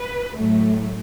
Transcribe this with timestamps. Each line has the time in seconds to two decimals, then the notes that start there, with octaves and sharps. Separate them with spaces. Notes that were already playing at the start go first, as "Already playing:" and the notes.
Already playing: B4
0.34 A2 F#3 A3